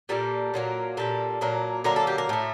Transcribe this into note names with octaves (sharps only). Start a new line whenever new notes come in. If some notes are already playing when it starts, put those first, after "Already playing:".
A#2 G3 A#3 A4
A#2 F#3 A#3
A#2 G3 A#3 A4
A#2 F#3 A#3
D3 F#3 A#3 A#4
A4
G4
A#4
A2 A3